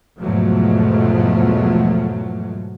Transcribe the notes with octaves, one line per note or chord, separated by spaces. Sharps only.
E2 G#2 B2 F3 F#3 A3